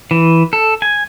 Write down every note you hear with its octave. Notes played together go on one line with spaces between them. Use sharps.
E3
A4
G#5